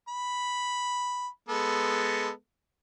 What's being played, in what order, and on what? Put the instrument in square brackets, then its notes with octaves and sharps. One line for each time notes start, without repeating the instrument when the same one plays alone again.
[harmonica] B5
G#3 B3 A4